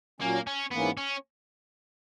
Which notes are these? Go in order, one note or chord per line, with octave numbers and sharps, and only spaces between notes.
A#2 F#3 A#3 C#4
C#4
G#2 E3 A#3 B3 C#4
C#4